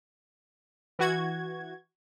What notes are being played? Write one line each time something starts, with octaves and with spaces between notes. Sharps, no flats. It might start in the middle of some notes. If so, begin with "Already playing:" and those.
E3 F#4 G#6